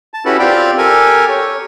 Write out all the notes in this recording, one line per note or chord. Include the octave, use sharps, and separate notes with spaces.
A5
C#4 E4 F#4 G4 A4 B4
C4 F4 G4 D5 G5
G4 A4 A#4 G#5
C#5